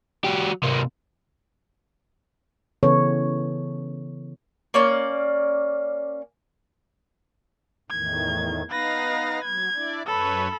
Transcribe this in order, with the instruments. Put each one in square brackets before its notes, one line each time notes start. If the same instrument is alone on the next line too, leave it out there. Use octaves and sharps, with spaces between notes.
[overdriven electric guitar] F#3 G4
C3 A#3
[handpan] C#3 E3 B3 A4 C#5
[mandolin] A#3 C#4 D5
[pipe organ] E2 A2 D#3 [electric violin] G#6
[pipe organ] B3 D#4 F5 [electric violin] B4 A#6
[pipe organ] F#3 [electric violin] G#6
[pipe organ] D4 E4 D5
[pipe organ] F#2 B4 C#5 [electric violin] A4 B5